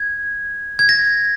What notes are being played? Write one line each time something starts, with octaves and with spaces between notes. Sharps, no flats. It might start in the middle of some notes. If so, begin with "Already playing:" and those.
Already playing: G#6
G#6
A#6